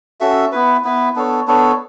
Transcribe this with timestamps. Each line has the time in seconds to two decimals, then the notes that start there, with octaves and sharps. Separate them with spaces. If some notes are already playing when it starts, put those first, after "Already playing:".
0.20 C#4 F#4 A4 E5
0.52 B3 E4 B4
0.84 B3 E4 B4
1.16 B3 D4 A4 C#5
1.47 B3 D4 A4 C#5